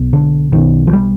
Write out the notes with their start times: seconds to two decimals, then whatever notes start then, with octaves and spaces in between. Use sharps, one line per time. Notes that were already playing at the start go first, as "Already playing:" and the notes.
Already playing: B1 B2
0.13 D3
0.52 B1 B2 D#3
0.87 F3
0.93 G3